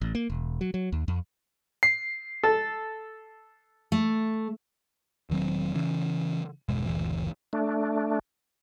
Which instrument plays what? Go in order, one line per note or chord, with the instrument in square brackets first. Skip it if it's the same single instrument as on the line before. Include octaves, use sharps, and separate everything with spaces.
[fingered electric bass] A1
A#3
E1
F#3
F#3
D#2
F2
[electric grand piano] C7
[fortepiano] A4
[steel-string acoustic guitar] A3
[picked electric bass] E1 D#3 F#3 C4
C#3 E3 C#4
G1 E2 B2 G#3
F#1 D2 A#2 E3
[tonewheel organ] A3 D4